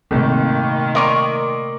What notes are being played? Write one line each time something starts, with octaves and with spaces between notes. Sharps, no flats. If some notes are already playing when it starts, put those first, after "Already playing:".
G#1 C3 D#3 A3 A#3
A#4 D5 D#5 C6 C#6 D#6